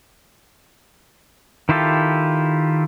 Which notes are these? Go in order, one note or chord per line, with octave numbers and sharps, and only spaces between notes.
D#3 E4 F4 G4 A4